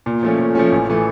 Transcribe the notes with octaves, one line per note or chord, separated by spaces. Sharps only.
A#2
F3 A3 C#4
A#2
F3 A3 C#4
A1
E3 A3